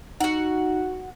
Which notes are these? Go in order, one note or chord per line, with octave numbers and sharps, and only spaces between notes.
D#4 F#4 F#5